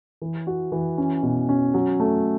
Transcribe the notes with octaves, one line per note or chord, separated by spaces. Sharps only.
E3
F#4
E3
C#4
B2
C#4
F#3
A3